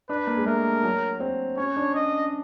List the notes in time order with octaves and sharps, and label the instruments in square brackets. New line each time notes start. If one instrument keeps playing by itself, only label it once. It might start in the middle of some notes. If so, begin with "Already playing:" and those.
[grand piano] D4 [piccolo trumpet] B4
[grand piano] A#3
G#3
[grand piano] A3 [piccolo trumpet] A#4
[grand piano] F#3
C4
[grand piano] C#4 [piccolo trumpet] C#5
[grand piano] D4
[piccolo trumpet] D#5